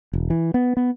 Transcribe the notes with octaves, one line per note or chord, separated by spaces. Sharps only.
E1
E3
B3
B3